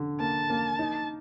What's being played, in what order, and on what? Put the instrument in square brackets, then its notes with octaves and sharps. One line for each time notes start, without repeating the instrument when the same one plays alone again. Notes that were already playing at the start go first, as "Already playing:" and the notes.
Already playing: [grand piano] D3
[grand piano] A#3 [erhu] A5
[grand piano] A#3
D#4